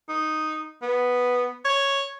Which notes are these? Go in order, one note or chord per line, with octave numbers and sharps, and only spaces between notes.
D#4
B3
C#5